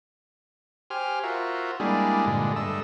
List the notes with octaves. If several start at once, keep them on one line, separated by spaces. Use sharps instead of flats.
G4 C5 G#5 F6
F4 F#4 A#4 C5 E5
G3 G#3 A#3 D4 E4 G#4
G2 A#2 D3 G#3
G2 A3 D#5 E6